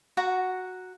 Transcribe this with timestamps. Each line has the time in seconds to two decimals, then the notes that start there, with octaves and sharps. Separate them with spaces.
0.17 F#4 F#5 A#5